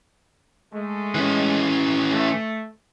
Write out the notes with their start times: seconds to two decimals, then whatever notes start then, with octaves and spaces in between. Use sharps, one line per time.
0.73 G#3 A3
1.15 E3 C#4
2.13 A3